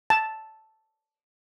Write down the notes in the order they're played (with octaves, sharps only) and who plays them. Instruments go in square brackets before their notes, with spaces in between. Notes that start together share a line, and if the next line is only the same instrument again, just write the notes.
[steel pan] A5